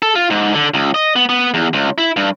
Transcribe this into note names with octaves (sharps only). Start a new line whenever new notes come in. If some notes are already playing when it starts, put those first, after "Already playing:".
A4
F4
G#2
D3
C#2
D#5
B3
B3
E2
C#2
E4
G2